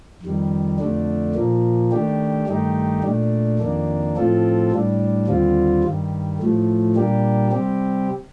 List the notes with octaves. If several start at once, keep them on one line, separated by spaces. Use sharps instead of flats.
F2 D#3 G3
F2 D3 A3 D4
A#2 F3 A#3
D#3 A3 D4 G4
G2 D#3 A3 D#4 G4
A#2 A3 D4
F2 D#3 A#3 D4
A2 F3 C4 F4 A4
A2 G3 D4
D#2 D3 G3 C4 F4
G2 D#3 G3
A2 F3 A3
A#2 G3 A#3 D4 G4
C3 G3 C4 G4